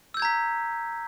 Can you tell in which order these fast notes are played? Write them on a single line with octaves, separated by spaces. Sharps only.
E6 G6 G#6 A#5 B6